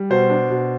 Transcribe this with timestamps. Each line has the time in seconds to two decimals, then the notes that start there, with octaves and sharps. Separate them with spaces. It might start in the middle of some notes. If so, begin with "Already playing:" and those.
Already playing: G3
0.10 B2 C5
0.30 D4
0.50 B2